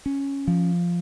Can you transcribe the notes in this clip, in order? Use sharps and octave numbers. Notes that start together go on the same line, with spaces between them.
C#4
F3